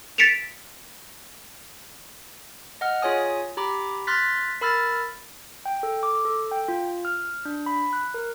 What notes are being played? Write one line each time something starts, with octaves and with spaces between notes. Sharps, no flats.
A6 B6 C#7 D7 E7 F7
D#5 F#5 F6
F4 G#4 C#5 G#5 D#6
G4 A#5 B5 D6
C6 F6 F#6 A6 B6
A#4 B5 E6 F6 A6
G5
A4
D6
A4
G5
F4
F6
D4
B5
F#6
A#4